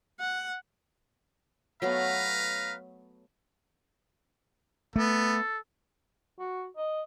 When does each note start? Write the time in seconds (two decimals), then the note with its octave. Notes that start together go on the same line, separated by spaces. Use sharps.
0.20 F#5
1.82 F#3 A3 B3 B4 F5 A#5
4.96 A3 B3 A4
6.39 F#4
6.77 D#5